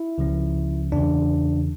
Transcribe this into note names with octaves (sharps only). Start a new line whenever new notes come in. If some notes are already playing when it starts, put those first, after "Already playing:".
Already playing: E4
C#2 C#3 F3 C#4
E2 C#3 E3 D4